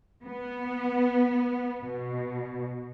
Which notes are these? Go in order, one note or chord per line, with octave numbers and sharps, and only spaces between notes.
B3
B2